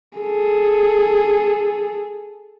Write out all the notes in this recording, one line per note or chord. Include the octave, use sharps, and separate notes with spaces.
G#4 A4